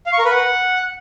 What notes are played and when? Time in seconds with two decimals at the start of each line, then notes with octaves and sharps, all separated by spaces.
0.06 F5
0.13 C#6
0.19 A#4
0.25 B4
0.31 F#5